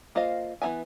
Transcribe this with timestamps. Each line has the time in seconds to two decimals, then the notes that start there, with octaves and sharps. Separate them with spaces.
0.15 A#3 F4 C5 D#5 F5
0.62 E3 F#3 B3 E5 G#5